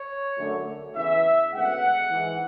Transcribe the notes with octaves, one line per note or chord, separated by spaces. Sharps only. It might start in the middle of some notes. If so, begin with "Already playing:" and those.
Already playing: C#5
F#2 D3 A3
E2 C#3 E3 B3 E5
D2 C#3 G#3 B3 F#5
G#2 E3 G#3